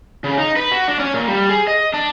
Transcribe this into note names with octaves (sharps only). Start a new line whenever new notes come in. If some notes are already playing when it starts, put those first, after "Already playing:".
C#3
D#4
B4
F#4
D4
C#4
A#2
G3
G#4
D#5
D4